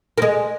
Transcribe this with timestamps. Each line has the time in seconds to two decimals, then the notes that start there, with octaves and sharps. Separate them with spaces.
0.18 A#3
0.22 G#3